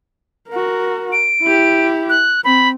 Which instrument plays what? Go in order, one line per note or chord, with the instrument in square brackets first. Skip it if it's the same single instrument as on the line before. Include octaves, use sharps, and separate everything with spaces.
[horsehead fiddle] F#4 A#4
[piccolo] D7
[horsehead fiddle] E4 G4
[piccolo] F#6
[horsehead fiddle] C4 [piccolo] B5